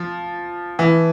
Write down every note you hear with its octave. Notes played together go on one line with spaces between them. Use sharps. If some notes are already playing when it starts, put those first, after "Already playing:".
Already playing: F3
E3